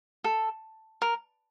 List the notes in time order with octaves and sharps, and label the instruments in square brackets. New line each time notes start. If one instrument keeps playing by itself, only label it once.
[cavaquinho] A4
A#4